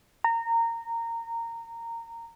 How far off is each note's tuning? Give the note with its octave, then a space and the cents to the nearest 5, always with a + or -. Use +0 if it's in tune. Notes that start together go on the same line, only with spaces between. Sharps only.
A#5 -20